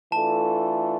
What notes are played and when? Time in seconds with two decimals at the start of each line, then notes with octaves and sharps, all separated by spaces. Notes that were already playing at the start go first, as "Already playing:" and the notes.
0.12 E3 A3 D4 F4 A4 A5